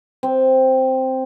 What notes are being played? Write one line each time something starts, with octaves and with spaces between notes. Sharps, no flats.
C4